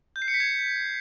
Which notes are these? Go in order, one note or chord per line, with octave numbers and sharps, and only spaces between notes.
G6
C7
C#7
B6
G#6